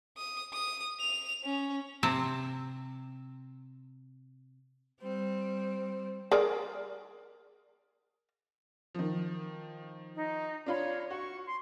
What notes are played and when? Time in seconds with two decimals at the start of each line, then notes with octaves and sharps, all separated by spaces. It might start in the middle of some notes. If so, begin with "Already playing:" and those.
0.17 D#6
0.53 D#6
1.00 F7
1.44 C#4
2.03 C3 C4 A5
5.01 G3 C4
6.32 G#4 A#4 D5
8.95 D#3 F3
10.16 D#4
10.66 D4 F4 C#5 B5
11.10 F#4 C#6
11.47 C6